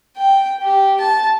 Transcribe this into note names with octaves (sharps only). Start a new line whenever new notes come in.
G5
G4
A5